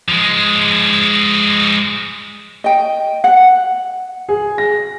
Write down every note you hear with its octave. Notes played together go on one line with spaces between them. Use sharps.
F3 G#3
D#5 G5
F#5
G#4
A#6